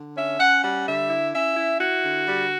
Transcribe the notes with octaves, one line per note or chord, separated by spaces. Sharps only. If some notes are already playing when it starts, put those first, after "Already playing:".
Already playing: D3
C#4 E5
C#4 F#5
G3 F#5
D3 E5
E4
C#4 E5
E4
E4 F#4
D3
G3